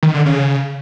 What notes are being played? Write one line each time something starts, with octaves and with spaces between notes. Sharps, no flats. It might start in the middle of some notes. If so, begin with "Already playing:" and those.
D#3
D3
C#3